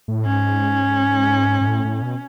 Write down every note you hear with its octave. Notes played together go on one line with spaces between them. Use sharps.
A2
G#2 C#4
G#2
A2
A2
B2